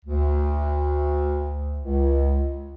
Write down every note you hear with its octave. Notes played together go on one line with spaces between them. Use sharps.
D2
C#2